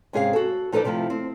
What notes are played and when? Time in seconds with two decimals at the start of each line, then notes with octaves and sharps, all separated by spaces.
0.13 G#2 C3 C#4 G#4 C5 F5
0.33 F#4 A4
0.72 F3 D#4 A4 B4 D5
0.85 C3 F3 A3 E4 F4
1.10 C4